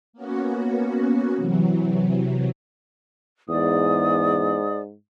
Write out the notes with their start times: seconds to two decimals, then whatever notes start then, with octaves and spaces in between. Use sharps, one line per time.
0.13 A#3 B3 C#4 F#4
1.37 C3 E3 F#3
3.49 E2 G#2 D5 D#6